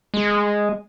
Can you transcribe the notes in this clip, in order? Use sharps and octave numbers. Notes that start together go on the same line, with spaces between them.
G#3